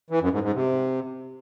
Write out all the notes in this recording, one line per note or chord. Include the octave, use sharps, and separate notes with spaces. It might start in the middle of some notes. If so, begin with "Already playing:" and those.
E3
F#2
G#2
G#2
C3